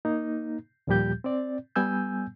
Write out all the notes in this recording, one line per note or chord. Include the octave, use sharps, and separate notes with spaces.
A#3 D#4
D#2 A#2 F3 G3 G4 G6
C4 D5
G3 B3 G#5 E6 G6